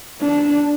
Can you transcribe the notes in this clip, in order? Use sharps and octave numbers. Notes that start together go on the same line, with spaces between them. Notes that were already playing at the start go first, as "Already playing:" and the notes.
D4